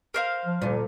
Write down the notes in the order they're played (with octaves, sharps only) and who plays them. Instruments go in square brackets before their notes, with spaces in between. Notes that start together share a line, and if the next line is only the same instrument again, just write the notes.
[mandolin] A#4 C5 F5
[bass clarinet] F3
[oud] D2 A#2 [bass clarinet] G3